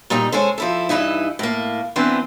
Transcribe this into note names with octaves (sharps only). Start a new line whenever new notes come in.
A#2 G3 D#4
G#3 C#4 A4 C5
F3 E4 A4
G2 B2 E3 D#4 E4
A2 A#3
E3 B3 C4 D4